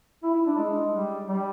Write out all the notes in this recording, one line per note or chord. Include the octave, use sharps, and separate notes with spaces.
E4
E4
D4
G#3
G3
G3